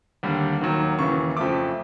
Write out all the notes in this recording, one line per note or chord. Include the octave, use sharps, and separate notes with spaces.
D#2 D3 G3
D#2 D#3 F#3
D#2 C#3 E3 C#6
F2 C#3 F3 A3 D6